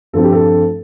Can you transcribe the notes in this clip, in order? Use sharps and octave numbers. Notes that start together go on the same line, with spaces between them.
G2 F3 A3 C4 A4
G4
A4